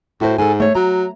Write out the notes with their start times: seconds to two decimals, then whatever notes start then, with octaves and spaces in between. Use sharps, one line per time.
0.21 A2 F#4 C5
0.38 G#2 A4 G#5
0.60 A3 C#5
0.75 F#3 A#5